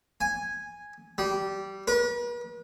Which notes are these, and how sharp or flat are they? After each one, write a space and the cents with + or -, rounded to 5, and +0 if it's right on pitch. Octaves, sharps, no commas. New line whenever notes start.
G#5 -5
G3 -15
B4 -45